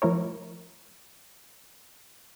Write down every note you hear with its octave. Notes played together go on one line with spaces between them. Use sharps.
F3 A3 E4 A#4 C#5